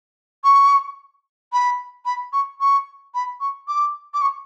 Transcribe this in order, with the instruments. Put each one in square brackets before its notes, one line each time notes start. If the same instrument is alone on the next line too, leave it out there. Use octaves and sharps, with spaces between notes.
[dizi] C#6
B5
B5
C#6
C#6
B5
C#6
D6
D6
C#6